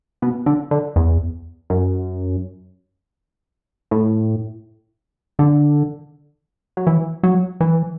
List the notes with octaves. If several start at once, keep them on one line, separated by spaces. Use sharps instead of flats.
B2
D3
D3
E2
F#2
A2
D3
F#3
E3
F#3
E3